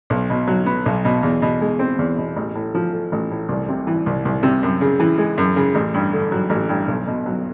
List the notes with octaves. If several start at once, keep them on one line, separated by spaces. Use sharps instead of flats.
B1
B2
F#3
B3
B1
B2
E2
B2
G#3
C4
E2
B2
A1
A2
F3
A3
A1
A2
C2
C3
E3
C2
C2
C3
F#2
C#3
E3
G#3
F#2
C#3
A1
G2
D3
F#3
A1
G2
B1
B2
F#3